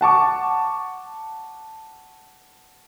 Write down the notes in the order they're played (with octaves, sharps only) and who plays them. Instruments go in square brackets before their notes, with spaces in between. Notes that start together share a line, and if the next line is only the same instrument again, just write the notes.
[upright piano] F#5 A5 C#6 D6